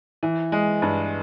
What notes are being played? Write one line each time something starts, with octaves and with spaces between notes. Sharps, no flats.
E3
G#3
G2